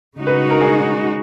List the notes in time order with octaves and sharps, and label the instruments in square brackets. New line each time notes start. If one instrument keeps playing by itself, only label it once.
[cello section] C#3 G#3 D#4 F#4
[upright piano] B4
A#4
G#4